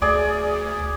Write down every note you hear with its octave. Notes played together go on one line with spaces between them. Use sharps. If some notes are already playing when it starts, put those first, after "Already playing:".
D2 G#4 D5